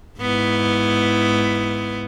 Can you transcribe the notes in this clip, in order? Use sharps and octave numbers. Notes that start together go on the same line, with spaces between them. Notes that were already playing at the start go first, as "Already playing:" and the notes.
G#2 B3 E4